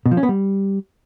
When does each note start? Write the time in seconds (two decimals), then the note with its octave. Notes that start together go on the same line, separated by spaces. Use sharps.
0.06 B2
0.11 F3
0.17 C#4
0.23 B3
0.29 G3